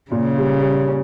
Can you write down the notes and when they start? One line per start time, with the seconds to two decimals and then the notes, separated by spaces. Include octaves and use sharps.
0.11 A#2 C#3
0.37 G3
0.62 G3
0.88 C#4